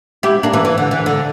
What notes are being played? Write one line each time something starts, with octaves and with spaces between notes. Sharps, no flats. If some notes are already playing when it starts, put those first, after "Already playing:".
E4 G4
A#3 D4
E3
E3
D3
E3
D3